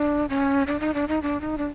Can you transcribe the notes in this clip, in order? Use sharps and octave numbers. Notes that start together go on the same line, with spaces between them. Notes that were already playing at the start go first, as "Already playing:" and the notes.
Already playing: D4
C#4
D4
D#4
D4
D#4
D4
D#4
D4